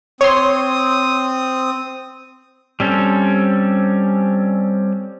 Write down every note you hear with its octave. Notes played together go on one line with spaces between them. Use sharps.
C4 C#5 C6 D#6
G3 C4 C#4 A4